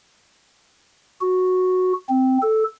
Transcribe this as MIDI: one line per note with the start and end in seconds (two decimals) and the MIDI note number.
1.21 1.93 66
2.09 2.38 60
2.42 2.64 69